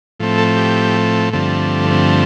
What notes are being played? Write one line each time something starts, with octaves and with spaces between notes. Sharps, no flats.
A2 F3 A3 C4
A4
G4
G2 D3 F3 A3 C4
C4